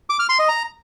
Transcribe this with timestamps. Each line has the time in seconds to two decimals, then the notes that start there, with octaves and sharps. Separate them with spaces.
0.10 D6
0.19 F6
0.29 C6
0.39 D#5
0.49 A#5